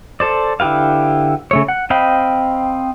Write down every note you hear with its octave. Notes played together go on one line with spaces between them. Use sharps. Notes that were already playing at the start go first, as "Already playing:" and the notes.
A4 C5 D5
D3 E4 G4 B4 F5
C#3 A3 C#5
F#5
C4 D#5 F5 G5 B5